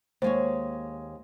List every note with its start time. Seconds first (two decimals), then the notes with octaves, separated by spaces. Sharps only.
0.22 D#2 G#3 C5 C#5